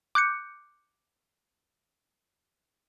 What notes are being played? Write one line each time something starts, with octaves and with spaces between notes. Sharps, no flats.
D6 F#6 G6 C#7